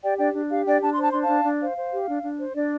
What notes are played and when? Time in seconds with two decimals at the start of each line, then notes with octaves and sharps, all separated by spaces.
0.02 G4 D5 G5
0.18 D4 D5 G5
0.34 D4
0.50 G4 F5
0.65 D4 D5 G5
0.81 D4 A5
0.92 C6
0.97 C5 A5
1.11 D4 C6
1.21 F5 A5
1.28 D4
1.44 D4
1.60 C5 F5
1.76 C5
1.92 G4
2.07 D4
2.23 D4
2.39 C5
2.55 D4 D5